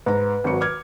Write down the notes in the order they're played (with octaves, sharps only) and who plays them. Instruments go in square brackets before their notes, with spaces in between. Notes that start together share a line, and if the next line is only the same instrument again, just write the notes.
[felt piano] G#2 A#5 [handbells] B4
[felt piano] G#1 F#3 C#7
D6 F6 G#6